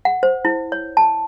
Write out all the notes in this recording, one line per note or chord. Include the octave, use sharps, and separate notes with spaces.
F#5
C5
E4
C#5
A5